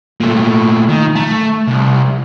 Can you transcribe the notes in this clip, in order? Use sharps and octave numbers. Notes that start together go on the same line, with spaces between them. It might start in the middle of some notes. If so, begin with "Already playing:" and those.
A#2 A3
D#3
A3
C2